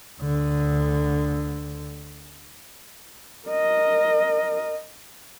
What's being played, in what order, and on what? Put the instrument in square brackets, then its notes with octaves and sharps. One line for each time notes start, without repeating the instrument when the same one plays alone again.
[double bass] D2 D3
[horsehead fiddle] A#4 D#5